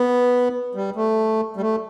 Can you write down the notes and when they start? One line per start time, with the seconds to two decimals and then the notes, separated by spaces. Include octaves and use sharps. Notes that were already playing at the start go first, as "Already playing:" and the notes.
Already playing: B3
0.75 G3
0.96 A3
1.57 G3
1.61 A3